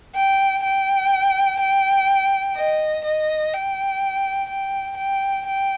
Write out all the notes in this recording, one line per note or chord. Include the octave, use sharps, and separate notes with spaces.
G5
G5
G5
D#5
D#5
G5
G5
G5
G5